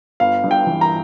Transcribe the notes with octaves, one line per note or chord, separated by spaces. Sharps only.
G1 F5
G2
G5
E3
A#5